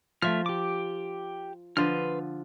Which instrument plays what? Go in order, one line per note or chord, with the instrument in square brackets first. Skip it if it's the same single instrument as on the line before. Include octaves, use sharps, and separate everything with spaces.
[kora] F3 [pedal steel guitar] A3 E5 F6
[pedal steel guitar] G4 D6
[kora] D3 F3 [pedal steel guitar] B4 C6 F6